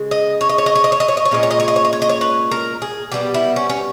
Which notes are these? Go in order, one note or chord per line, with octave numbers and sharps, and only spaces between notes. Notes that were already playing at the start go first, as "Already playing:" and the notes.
Already playing: C#3 G#3
D#5
C#5
D#5
C#5
D#5
C#5
D#5
C#5
D#5
C#5
D#5
C#5
A#2 G#3 C#4 D#5
C#5
D#5
C#5
D#5
C#5
D#5
C#5
D#5
C#5
B4
A#4
G#4
B2 G3 B3 G4
E4
C#4
C#4